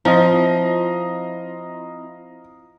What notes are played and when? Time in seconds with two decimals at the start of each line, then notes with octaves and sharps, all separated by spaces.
0.05 F3 C4 E4 F4 D#5 F5 A#5